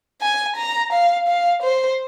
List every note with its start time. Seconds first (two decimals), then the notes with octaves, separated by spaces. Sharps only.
0.21 G#5
0.56 A#5
0.92 F5
1.28 F5
1.62 C5